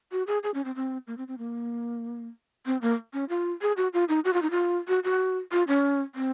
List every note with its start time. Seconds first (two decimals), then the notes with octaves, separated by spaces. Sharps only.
0.12 F#4
0.27 G#4
0.43 G#4
0.54 C#4
0.65 C4
0.75 C4
1.07 A#3
1.18 C4
1.28 C4
1.38 A#3
2.66 C4
2.82 A#3
3.13 C#4
3.29 F4
3.62 G#4
3.77 F#4
3.93 F4
4.09 D#4
4.25 F#4
4.33 F4
4.42 D#4
4.51 F4
4.88 F#4
5.04 F#4
5.52 F4
5.68 C#4
6.15 C4